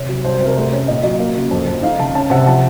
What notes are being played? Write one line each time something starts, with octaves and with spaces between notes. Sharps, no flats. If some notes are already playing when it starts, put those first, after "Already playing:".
Already playing: C3 C#5
F#3
C2 C5
C5
C3
A#4
A3 C5
C#4 C#5
A#2 D#5
F#3 D#5
A#3
C#3
F2
F2
D#4 F5
C#3 A5
C#4 A5
C3 F#5
F3 A5